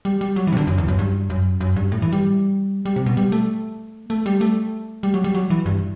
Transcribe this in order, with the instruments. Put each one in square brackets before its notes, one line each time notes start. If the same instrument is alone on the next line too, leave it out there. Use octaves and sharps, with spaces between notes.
[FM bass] G3
G3
F#3
E3
C3
D3
F#2
E2
F#2
G2
F#2
F#2
G2
A2
E3
G3
G3
C3
B2
G3
A3
A3
G3
A3
G3
F#3
G3
F#3
E3
G2